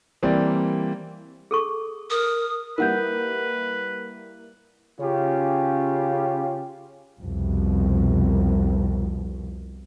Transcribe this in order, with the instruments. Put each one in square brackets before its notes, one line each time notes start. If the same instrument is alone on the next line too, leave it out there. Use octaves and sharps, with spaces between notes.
[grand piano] E3 G3 A#3 C4 D5
[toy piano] G#4 A4 C#6
[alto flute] A#4 [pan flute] D#6
[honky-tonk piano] G3 A#3 E4 [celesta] A#4 F#5 G6 [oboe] B4
[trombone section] C#3 C#4 F4 G4
[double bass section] C2 F2 B2